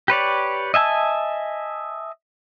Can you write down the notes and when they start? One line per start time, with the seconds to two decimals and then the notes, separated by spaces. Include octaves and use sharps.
0.08 G4 B4 C#5 D5
0.74 D#5 E5 G#5 A5 E6